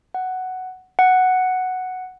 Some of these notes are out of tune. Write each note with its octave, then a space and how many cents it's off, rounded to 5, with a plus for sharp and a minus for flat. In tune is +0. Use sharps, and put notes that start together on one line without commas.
F#5 +5
F#5 +0